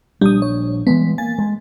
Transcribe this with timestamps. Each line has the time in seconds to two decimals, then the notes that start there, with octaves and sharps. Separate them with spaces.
0.21 A#1 G3 D4 D#6
0.42 C#5
0.87 E3 G3 G#3 B3
1.18 A#3 G#5 A6
1.38 G#3